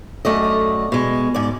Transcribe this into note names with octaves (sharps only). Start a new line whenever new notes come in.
F#2 A3 D5 D#5
B2 G#3
G#2 D5